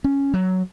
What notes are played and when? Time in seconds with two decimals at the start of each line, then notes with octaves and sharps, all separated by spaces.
0.04 C#4
0.34 F#3